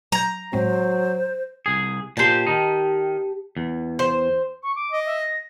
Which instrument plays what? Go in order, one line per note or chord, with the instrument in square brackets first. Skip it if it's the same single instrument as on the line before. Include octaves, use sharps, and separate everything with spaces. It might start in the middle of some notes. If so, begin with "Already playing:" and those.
[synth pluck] F#3 G6 [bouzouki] A#5
[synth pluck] A2 G#3 C4 [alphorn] F#3 [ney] C5
[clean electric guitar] C2 G#4
[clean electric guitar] A#2 C5 [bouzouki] G4 A5
[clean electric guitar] D#3 D#4
E2
[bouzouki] C5
[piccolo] C#6
D6
[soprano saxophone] D#5
[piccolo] E5
A#6